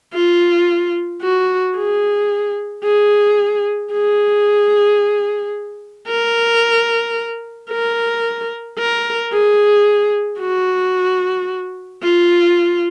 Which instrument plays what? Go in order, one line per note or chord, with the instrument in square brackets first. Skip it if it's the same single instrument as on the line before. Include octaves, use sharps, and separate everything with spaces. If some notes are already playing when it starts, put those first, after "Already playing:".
[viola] F4
F#4
G#4
G#4
G#4
A#4
A#4
A#4
G#4
F#4
F4